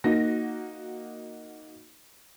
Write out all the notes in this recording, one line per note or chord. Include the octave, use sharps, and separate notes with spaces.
A#3 D#4 F#4 A#6